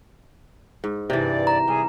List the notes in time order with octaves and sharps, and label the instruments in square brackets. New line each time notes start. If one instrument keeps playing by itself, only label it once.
[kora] G#2
[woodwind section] G2 D5 [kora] C3 E3
[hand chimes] A#5
[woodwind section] C3 G#4 [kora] G3